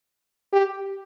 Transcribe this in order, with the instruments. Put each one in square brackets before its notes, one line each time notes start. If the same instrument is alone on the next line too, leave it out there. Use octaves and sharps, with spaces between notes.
[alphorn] G4